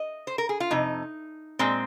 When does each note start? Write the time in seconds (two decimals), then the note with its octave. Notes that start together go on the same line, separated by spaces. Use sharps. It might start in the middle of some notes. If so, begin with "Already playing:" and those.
Already playing: D#5
0.27 C5
0.38 A#4
0.49 G#4
0.60 F4
0.71 F2 C3 D#4
1.59 A#2 G#3 C4